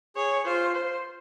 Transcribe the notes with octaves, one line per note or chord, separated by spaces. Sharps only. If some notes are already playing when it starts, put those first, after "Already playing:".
G#4 C#5
F4 C5
C5